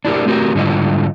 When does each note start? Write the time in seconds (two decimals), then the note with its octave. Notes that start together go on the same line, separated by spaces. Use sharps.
0.05 D4 E4 G4 A#4
0.26 A3 C4 F#4 G4 A#4
0.55 G#2 D3 G3 E4 F4 D#5